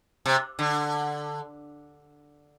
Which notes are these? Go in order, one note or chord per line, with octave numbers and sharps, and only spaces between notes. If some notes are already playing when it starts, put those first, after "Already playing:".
C3
D3